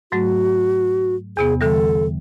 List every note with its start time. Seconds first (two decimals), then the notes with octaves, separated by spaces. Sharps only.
0.12 G#2 F#3 A3 F#4
1.37 E2 C3 B3 G#4
1.61 D3 E3 G3 A4